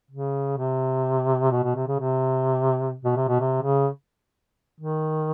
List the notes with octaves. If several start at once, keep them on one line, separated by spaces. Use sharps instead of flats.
C#3
C3
B2
B2
C3
C#3
C3
B2
C3
B2
C3
C#3
D#3